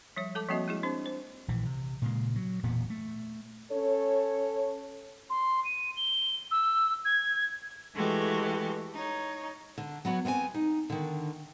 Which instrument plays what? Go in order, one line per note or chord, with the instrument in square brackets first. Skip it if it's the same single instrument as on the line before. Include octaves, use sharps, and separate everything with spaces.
[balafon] F3 G3 C#5
G#3 A4 A5 D6
F3 G3 A#3 C4 F#4 D#5
G#3 E4 G#4
C4 D4 C5
C5
[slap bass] A#1 E3
C3
A#2 C#3 G#3
F#3
E1 A#2 B3
A3
[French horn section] C#4 A4 C#5
[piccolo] C6
D#7
G7
E6
G#6
[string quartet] E3 G#3 A3 F#4 G4
D#4 C#5
[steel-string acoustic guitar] D3
F#3 B3 F#4 C#5
B3 C4 F#5 G#5
D#4
D3 D#3